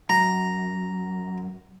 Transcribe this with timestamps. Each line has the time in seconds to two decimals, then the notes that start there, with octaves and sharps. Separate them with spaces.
0.10 F#2 A#5